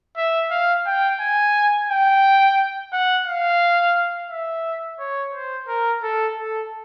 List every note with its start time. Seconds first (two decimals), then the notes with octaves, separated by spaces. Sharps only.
0.16 E5
0.50 F5
0.86 G5
1.20 G#5
1.89 G5
2.92 F#5
3.27 F5
4.30 E5
4.99 C#5
5.33 C5
5.68 A#4
6.03 A4
6.37 A4